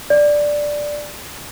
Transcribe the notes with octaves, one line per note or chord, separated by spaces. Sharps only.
D5